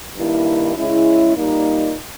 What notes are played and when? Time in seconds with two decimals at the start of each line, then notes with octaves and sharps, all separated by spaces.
0.17 G2 D#3 A#3 E4
0.77 C#3 G#3 C#4 E4
1.36 A#2 G3 A#3 D#4